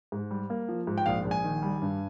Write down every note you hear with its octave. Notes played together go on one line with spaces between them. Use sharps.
G#2
G3
A#3
F3
G#2
G5
A#1 F5
A#1
G#5
D#3
G3
G2